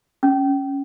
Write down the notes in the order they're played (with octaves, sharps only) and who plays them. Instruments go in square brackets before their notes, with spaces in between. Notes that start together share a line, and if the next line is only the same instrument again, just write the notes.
[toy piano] C#4